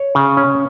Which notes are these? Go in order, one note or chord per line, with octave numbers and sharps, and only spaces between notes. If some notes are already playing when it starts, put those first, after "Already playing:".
Already playing: C#5
C#3
C#4